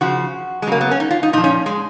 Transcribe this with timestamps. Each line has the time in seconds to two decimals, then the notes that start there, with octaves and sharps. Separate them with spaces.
0.01 C#3 F3 F#4
0.62 G#3
0.67 C#3 F#3 A#3
0.81 B3
0.91 C#4
1.00 D#4
1.11 F4
1.23 D#4
1.33 A#2 D#4
1.38 F3
1.44 C#4
1.66 G#3